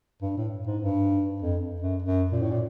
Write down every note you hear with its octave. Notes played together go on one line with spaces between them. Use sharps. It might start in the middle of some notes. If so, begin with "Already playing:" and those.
G2
A2
G#2
G2
F2
F#2
F#2
A#2
A2
A#2